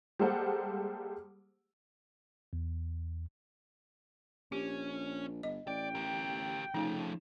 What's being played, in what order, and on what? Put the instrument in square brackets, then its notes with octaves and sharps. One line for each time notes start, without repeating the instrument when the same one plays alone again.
[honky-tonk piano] G3 G#3 A#3 A4 C5 F#5
[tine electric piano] E2
[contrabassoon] A#1 [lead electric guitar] C#4 [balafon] G4
[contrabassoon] G1 [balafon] D#5
[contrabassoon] A1 [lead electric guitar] D5 [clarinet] G5
[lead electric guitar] G4 A#4
[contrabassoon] C#3 [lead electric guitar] F3 A3 [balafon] D#4